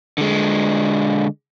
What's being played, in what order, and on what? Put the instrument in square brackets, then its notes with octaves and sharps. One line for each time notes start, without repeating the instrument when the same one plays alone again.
[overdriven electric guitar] D3 G#3